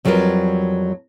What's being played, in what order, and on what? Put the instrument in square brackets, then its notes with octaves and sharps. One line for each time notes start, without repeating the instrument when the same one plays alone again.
[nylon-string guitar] F2 F#3 G3 F4 A#4 B4